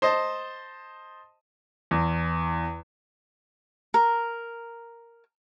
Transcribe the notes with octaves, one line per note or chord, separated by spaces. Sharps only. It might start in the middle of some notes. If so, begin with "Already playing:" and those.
C5 D#5 A5
E2
A#4